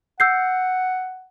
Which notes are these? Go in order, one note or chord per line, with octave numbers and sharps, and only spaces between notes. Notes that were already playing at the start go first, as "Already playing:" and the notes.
F#5 E6 G6 C7